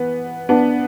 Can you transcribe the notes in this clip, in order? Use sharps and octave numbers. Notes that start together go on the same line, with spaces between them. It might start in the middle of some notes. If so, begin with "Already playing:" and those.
Already playing: E3 B3
B3 D4